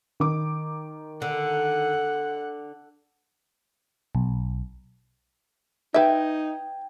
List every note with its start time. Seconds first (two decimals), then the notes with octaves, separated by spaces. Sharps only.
0.20 D#3 D6
1.22 D3 F#5
4.15 B1
5.94 D#4 B4 E5 G5 G#6 D7